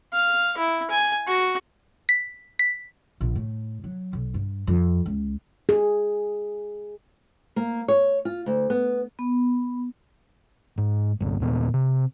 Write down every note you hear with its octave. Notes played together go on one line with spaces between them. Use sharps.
F5
E4
G#5
F#4
B6
B6
A#1
A2
F#3
B1
G2
F2
C#2
G#4
A#3
C#5
F4
D2
B3
B3
G#2
G1 C2 G2
D#2 A#2 B3
C3